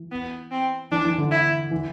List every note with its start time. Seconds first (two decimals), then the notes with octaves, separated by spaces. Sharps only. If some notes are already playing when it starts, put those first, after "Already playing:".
Already playing: E3
0.12 B3
0.51 C4
0.92 E3 D4
1.05 E3
1.18 D3
1.31 E4
1.71 E3